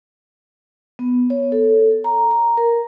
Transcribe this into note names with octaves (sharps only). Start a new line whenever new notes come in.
B3
C#5
A4
A#5
A#5
A#4